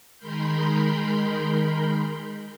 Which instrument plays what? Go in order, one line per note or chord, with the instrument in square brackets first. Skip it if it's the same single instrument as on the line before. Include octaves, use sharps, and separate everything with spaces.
[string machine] D#3 G#3 A#4 B5 C6 G6